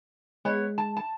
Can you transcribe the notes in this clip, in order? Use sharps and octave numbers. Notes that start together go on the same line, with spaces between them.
G#3 B3 C#5
A5
A5